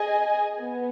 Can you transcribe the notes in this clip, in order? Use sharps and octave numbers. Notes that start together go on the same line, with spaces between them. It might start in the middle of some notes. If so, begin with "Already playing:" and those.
Already playing: G#4 D#5 G#5
B3